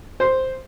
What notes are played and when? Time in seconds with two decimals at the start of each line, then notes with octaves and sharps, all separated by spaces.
0.20 C5